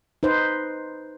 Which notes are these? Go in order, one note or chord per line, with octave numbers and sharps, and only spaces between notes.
D#4 B4 C5